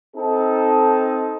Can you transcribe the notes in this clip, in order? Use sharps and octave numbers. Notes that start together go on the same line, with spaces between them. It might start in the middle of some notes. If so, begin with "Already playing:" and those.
C4 D#4 A4